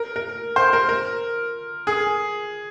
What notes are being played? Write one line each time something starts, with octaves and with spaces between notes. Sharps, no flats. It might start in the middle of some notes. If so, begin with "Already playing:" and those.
Already playing: A#4
A#4
C5
A#4
A#4
G#4